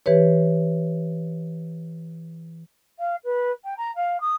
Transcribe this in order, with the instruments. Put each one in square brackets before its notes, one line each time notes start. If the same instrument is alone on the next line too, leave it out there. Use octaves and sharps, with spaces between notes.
[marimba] E3 G4 B4 C#5
[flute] F5
B4
G5
A#5
F5
D#6